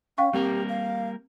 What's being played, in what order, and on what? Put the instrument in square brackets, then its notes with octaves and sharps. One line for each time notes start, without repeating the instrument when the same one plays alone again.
[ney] C#4 [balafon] F5 G5 C#6
[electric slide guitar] G3 A#3 A#4 [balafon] C4 [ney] G4
[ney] F5